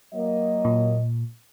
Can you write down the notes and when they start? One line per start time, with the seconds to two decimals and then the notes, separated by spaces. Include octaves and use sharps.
0.14 F#3 A#3 D#5
0.65 A#2